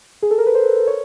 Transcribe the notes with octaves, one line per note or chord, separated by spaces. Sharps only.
G#4
A4
A#4
B4
C5
C#5